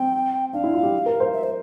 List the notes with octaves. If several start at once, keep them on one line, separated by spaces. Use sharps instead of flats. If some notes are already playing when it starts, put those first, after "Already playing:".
Already playing: C4 G5
D4 F5
E4
F4
G4
A#4
C5
E5
C5